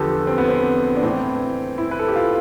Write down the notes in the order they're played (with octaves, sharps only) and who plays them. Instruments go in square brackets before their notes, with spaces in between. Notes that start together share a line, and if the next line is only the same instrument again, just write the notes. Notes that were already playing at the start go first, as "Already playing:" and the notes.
Already playing: [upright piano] E2 D3 F3 G4 A4 B4
C4
B3
C4
D4
A2 E3 C4
E4
B4
A4
G4
F4